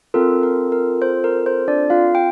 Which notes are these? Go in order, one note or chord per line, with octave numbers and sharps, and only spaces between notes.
C4 F4 A4 A#4
A#4
A#4
C5
A#4
C5
D4 D5
F4 F5
G5